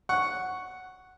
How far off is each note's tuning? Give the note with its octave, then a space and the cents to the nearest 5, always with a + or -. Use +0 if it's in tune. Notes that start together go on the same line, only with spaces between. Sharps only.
F#5 +0 C#6 +0